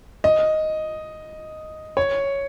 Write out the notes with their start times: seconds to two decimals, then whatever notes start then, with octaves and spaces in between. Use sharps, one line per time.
0.24 D#5
1.97 C#5